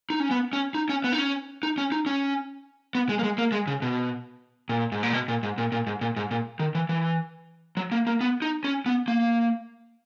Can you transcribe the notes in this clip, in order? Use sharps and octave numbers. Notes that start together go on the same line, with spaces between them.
D#4
C#4
B3
C#4
D#4
C#4
B3
D#4
C#4
D#4
C#4
D#4
C#4
B3
G#3
A#3
G#3
A#3
G#3
C#3
B2
A#2
G#2
A#2
B2
A#2
G#2
A#2
A#2
G#2
A#2
G#2
A#2
D#3
E3
E3
F#3
A#3
A#3
B3
D#4
C#4
B3
A#3